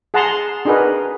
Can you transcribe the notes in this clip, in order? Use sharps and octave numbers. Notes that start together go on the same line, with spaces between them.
G#4 F#5 A5 A#5 C6
D4 D#4 F#4 G#4 A#4 B4